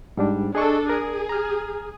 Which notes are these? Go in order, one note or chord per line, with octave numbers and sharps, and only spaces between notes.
G#2 G3 D4
D4 G#4 A4 D#5 C#6
G#4 A#4
A#5 F6